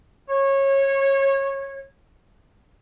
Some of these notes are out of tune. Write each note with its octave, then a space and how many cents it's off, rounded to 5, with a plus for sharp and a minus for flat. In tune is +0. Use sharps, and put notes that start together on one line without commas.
C#5 -20